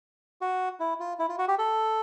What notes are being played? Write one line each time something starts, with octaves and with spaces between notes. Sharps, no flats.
F#4
E4
F4
E4
F4
F#4
G4
A4